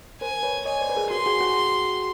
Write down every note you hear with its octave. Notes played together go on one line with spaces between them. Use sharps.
A#4 C5 G#5
B4 C#5
C#5 D#5 G#5
C5 D5
B4
G#4 A#4
F#4 G#4 C6
F#4 G#4
F#4 G#4